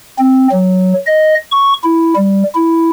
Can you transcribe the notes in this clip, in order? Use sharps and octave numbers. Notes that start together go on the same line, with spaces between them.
C4
F#3
D#5
C#6
E4
G3
E4